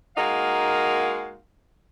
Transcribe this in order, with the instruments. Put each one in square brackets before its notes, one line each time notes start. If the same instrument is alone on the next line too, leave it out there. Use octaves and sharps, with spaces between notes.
[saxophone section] G#3 A#3 D#4 F#4 A#4 F5